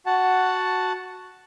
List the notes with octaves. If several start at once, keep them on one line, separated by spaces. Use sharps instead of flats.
F#4 F#5 A5